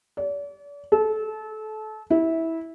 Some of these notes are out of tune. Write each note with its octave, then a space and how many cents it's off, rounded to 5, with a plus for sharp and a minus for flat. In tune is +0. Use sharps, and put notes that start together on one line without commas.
D5 -40
A4 -25
E4 -15